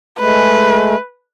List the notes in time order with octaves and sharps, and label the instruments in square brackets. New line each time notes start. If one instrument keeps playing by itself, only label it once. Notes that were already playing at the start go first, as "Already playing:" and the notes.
[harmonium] G#3 A3 [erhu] B4